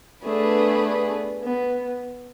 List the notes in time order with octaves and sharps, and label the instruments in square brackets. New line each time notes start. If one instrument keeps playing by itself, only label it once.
[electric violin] A3 [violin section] B3 D4 G#4 B4
[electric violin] B3